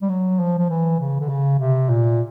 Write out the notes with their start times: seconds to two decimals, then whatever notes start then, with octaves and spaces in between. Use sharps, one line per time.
0.02 G3
0.09 F#3
0.39 F3
0.58 F3
0.70 E3
1.00 C#3
1.20 D3
1.29 C#3
1.59 C3
1.89 A#2